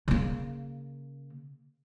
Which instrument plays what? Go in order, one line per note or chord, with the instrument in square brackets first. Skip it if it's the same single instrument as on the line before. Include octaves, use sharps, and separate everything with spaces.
[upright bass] C#3 A#3